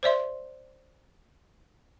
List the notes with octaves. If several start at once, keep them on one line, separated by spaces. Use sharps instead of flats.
C5 D5 E5 C6